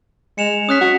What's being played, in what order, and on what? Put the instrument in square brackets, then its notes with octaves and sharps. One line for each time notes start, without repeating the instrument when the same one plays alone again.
[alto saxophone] G#3 [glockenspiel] C#7 E7 F7
[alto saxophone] C#4 [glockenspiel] D#6 F#6 B6
[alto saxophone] F#4